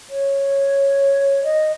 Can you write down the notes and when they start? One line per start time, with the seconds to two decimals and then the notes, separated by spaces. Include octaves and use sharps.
0.10 C#5
1.44 D#5